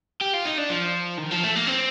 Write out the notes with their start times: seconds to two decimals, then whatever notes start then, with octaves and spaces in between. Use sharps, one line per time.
0.22 G4
0.34 F4
0.46 D#4
0.58 D4
0.71 F3
1.19 D#3
1.31 F3
1.43 A3
1.55 A#3
1.67 C4